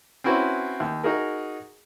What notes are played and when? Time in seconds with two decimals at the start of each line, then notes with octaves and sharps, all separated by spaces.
0.24 C4 C#4 E4 F#4 B4 C5
0.80 D#2
1.04 D#4 F#4 G#4 A#4